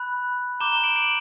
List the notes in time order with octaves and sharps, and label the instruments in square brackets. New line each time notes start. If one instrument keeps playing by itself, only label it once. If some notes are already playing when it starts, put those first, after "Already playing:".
Already playing: [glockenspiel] B5 F#6
A#5 D6 G6 E7 G7
E7 G7
D7 F#7
D7 F#7